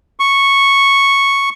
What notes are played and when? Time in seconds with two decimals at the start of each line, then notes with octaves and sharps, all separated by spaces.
0.20 C#6